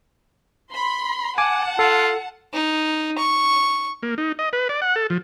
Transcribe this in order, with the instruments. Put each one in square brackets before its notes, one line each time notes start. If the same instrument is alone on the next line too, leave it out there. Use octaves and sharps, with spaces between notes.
[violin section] B5 C6
[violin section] F#5 A5 [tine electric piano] G#5 D6
[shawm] F4 [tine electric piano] A4
[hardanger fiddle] D#4
C#6
[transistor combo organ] A#3
D#4
D#5
B4
D5
F#5
A4
F3